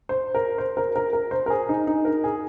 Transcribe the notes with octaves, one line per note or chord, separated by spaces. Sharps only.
C5
A#4
C5
A#4
A#4
A#4
C5
A#4
G#4
D#4
D#4
A#4
G#4